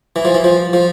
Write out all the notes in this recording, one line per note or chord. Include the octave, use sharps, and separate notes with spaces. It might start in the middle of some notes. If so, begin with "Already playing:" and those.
E3
F3
E3
F3
F3